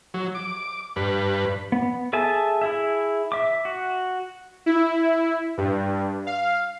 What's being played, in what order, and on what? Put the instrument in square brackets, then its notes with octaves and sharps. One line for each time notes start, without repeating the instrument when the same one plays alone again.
[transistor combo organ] F#3
D6
G2 B4
[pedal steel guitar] B3
G#4 A4 E5 G#5 A5
E4 G#4 E5
E5 D6
F#4
[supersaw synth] E4
G2
F5